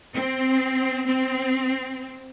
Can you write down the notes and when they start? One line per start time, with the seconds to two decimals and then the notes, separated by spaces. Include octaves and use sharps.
0.15 C4
1.07 C4